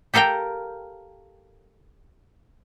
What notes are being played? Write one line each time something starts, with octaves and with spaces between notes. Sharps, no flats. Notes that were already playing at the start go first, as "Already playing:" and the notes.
G4 A4 A#4 F5 G5